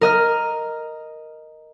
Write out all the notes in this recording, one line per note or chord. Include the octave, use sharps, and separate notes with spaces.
A#4 D#5 F6